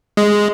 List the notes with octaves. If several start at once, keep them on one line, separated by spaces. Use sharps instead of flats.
G#3